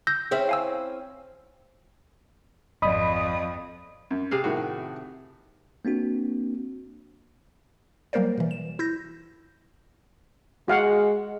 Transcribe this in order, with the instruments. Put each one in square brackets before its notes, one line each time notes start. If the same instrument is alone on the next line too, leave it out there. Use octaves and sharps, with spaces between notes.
[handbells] E6 G6 A#6
[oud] C4 C#4 E4 [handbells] G#4 C5 E5
[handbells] F5 G#5 E6
[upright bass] G#1 [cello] F2 [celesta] D5 D#5 [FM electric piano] B5 D#6
[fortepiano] F#2
[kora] C3 G#4 F5
[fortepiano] A2 D#3 F#4
[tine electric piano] A#3 C4 D4 F#4
[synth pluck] F#3 G3 A#3 A#4 C5 D5
B2 E3
E7
E4 G6 A#6
[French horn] G#3 [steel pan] F#4 F5 F#5